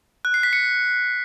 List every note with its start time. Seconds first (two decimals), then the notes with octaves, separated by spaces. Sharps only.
0.25 F#6
0.34 C7
0.43 B6
0.53 C#7